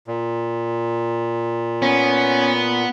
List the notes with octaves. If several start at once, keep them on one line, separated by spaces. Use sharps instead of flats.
A#2
B3 C#4